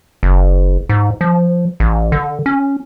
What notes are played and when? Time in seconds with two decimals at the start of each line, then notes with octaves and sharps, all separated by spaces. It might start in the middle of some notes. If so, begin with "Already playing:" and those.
0.23 F#1
0.89 G#2
1.21 F3
1.80 A1
2.12 D3
2.46 C#4